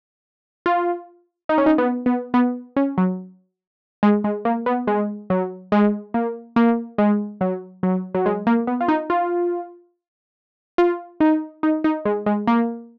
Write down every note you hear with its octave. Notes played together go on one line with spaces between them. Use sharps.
F4
D#4
C#4
D#4
B3
B3
B3
C#4
F#3
G#3
G#3
A#3
B3
G#3
F#3
G#3
A#3
A#3
G#3
F#3
F#3
F#3
G#3
A#3
B3
F4
D#4
F4
F4
D#4
D#4
D#4
G#3
G#3
A#3